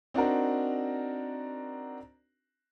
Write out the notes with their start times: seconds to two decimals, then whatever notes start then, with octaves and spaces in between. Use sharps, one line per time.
0.14 C4 D4 D#4 F#4 A#4